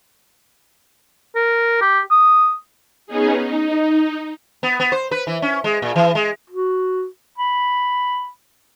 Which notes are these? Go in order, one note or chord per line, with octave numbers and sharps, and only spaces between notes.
A#4
G4
D#6
B3 C#4 D#4 G#4
D#4
B3
B3
C5
B4
E3
C#4
G#3
A#2
E3
G#3
F#4
B5